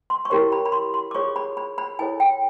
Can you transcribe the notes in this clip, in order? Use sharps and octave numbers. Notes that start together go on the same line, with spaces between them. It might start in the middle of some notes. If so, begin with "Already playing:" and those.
C6
C#6
C#4 E4 G4 A#4 C#5 C6
B5
B5
C6
C6
D6
F4 G#4 C#5 C#6
B5
B5
B5
E4 A4 C#5 G#5
G5